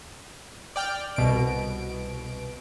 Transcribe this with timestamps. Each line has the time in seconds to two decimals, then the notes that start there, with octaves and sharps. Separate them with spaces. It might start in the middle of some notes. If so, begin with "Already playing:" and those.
0.76 D5 G5 F6
1.16 C2 B2 D7